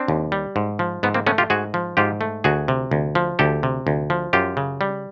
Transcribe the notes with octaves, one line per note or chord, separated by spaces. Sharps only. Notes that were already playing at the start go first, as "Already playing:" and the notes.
Already playing: C4 D4
D#2
G3
G#2
F3
G#2 B3
A#3 C4
A3 B3 C#4
F4 G4
G#2 F#4 G#4
F3
G#2 F4 G4
A3
D2 F#4 G#4
C3
D2
F3
D2 G4 A4
C3
D2
F3
F#2 F4 G4
C#3
G3